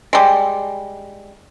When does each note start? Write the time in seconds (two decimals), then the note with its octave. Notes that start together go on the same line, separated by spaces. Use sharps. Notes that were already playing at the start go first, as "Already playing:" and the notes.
0.13 G3 G#3